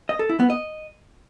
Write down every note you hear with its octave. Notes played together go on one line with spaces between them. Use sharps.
D#5
A4
E4
B3
D#5